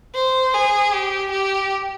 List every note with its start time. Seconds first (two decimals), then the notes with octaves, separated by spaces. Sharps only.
0.15 C5
0.53 G#4
0.93 G4
1.31 G4